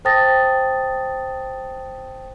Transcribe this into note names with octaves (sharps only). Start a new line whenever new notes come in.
C5 G5 A5 D#6 A6 A#6